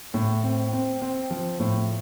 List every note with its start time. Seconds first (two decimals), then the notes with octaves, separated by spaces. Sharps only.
0.14 A2
0.43 C4
0.73 C4
1.02 C4
1.31 F3
1.59 A2